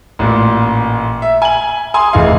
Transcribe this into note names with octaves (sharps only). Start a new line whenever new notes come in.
A1 A#2
E5
G#5 F#7
G#5 C6 D#6
F1 E3 E4 G#4 D#5 F5